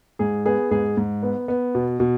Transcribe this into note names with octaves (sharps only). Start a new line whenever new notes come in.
G#2 G#4
B3 G#4
G#2 G#4
G#2
B3
B3
B2
B2